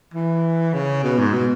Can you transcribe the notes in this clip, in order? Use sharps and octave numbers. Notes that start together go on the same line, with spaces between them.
E3
C#3
B2
G#2
B2